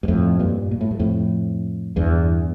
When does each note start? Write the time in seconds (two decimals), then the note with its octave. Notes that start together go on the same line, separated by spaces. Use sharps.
0.03 G2
0.08 F2 A2
0.39 G2 A#2
0.71 A#2
0.81 A2
0.91 G2
0.99 F2 A2
1.96 E2 G2